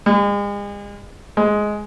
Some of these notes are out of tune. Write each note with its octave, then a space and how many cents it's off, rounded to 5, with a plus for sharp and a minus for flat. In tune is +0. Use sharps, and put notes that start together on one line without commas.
G#3 -40
G#3 +10